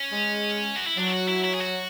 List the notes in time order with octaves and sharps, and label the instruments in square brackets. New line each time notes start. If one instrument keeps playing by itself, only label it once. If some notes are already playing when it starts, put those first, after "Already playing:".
Already playing: [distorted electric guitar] C#4
[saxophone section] G#3
[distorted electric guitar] F#4
E4
[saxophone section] F#3 [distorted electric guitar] D4
[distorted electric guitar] E4
F#4
E4
E4
G#4
F#4